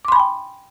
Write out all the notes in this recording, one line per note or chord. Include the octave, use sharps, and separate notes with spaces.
G5 G#5 B5 C6 D6